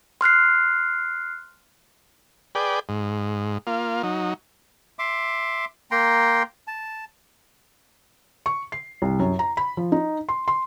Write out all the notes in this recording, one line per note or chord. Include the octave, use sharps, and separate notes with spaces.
C6 F6 F#6 C7
G#4 B4 D5 G5
G#2
A#3 F4
F#3 D#4
E5 C6 D6
A#3 G5 A#5 C6
A5
C#6
C7
C2
F#2
A#5
B5
F3
D#4
C6
C6